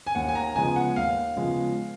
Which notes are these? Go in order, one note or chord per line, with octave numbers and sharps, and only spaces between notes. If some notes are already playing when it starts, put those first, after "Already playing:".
G#5
D#2 F#5
G#5
A#5
C#3 F3 G#3 B3 G#5
F#5
D#2 F5
C#3 F3 G#3 B3